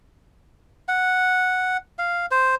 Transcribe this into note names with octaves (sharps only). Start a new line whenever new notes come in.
F#5
F5
C5